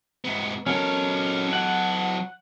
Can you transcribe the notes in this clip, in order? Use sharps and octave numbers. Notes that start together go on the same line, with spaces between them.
G#2 B3
F#3 C#4 A4 A#4
F#5